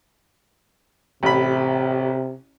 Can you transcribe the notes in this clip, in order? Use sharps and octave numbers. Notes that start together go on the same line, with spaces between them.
A1 C3 B5